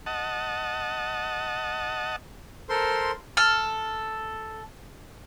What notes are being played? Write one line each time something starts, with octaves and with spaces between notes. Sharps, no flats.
D#5 F#5 A5
A4 A#4 C5 C6
A4 F6